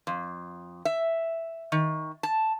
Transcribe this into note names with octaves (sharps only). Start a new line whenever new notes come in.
F2
E5
D#3
A5